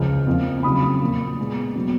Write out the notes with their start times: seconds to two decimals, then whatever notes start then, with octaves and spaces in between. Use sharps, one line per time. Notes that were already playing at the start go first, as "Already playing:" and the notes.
Already playing: C#2 C#3 F3 F6
0.27 F2 F3 A#3
0.63 F2 C#3 F#3 B5 D#6
1.01 A#2 F3 A#3
1.39 A#2 G#3 B3
1.76 B2 F#3 B3